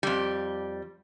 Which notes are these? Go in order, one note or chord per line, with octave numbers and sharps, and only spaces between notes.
F2 G3